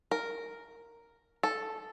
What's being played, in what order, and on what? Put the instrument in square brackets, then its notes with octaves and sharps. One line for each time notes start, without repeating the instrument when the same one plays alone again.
[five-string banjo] A#4
A4